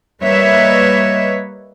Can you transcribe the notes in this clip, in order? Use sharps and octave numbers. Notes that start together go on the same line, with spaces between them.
G3 A#3 B4 C#5 D#5 E5